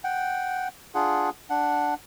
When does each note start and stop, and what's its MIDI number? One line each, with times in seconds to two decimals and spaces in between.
0.04 0.68 78
0.04 0.68 79
0.95 1.30 62
0.95 1.30 65
0.95 1.30 68
0.95 1.30 78
1.50 1.94 62
1.50 1.94 78